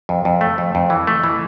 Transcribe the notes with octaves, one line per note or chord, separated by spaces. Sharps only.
F2
F2
A3
F2
F2
E3
A3
E3